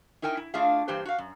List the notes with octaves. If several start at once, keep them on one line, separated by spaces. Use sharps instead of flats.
D#4 E4 A#4 G5 G#5
E4
A3 D4 F4 G#4 E5 F5
G2 E3 A#3 G4 C5
F#4 F5
F#2